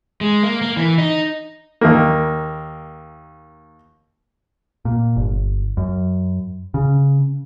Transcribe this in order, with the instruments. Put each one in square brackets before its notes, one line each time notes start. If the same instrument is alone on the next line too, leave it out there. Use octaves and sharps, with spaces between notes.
[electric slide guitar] G#3
A#3
A#3
E3
D#4
[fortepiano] D#2 A#3
[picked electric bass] A#2
G1
F#2
C#3